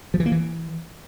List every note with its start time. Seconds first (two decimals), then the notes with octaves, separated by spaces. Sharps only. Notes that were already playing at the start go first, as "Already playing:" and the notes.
0.14 F3
0.20 E3
0.26 A#3
0.32 E3